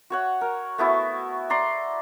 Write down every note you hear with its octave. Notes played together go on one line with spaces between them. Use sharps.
F#4 C#5 F#5
A#4
A3 B3 E4 F#4
D5 A#5 C6